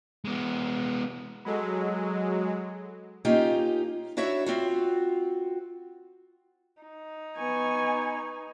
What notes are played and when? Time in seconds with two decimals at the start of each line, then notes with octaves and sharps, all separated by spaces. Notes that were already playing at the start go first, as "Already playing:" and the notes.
0.25 G#3 B3
1.45 F#3 G#3 A4 B5
3.25 A#3 C#4 D#4 F4 G4
4.17 D4 E4 F#4 C#5 E5
4.46 C4 F4 F#4
6.82 D#4
7.38 B3 G#5 C#6